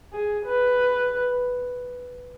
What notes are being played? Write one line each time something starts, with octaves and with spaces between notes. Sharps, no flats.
G#4
B4